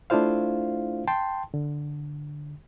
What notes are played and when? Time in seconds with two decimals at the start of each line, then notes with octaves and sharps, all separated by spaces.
0.10 A3 D4 E4 F4 C5 F5
1.08 G5 A5 C6
1.54 D3